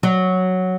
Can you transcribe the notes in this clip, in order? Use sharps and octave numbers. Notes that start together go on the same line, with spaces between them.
F#3